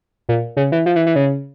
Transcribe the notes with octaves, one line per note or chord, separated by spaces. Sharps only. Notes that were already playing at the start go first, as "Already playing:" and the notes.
A#2
C#3
E3
F3
E3
E3
C#3